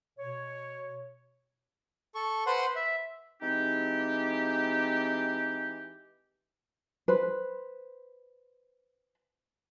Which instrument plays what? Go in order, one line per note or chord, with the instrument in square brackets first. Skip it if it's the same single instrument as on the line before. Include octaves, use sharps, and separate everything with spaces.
[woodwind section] B2 C#5
[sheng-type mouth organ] A4 C#6
B4 C5 F#5 C6
E5
[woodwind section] E3 G#3 C4 D#4 G4
[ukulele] B4 C5